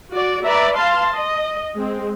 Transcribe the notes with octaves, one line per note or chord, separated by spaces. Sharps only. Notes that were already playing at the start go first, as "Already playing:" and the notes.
F#4 D5
B4 D5 E5 A#5
F5 A5 C6
D#5
G#3 C4